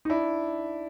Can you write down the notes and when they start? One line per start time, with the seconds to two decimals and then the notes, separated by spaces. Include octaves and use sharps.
0.05 D#4
0.10 D4 E4